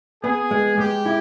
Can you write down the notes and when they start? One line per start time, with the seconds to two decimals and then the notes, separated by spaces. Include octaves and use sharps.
0.23 B3 G#4
0.51 G#3
0.78 G#3 G4
1.06 E4